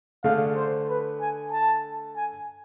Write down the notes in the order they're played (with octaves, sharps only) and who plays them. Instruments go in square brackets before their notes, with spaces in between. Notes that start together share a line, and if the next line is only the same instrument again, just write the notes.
[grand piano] D3 A3 D4 G#4 [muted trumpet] F5
[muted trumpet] C5
B4
G#5
A5
G#5